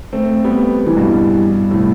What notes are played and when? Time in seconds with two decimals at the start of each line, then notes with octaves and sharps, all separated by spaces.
0.13 A3 C4
0.44 G3 B3
0.86 E3 G3
0.97 G2 B2
1.71 A2 C3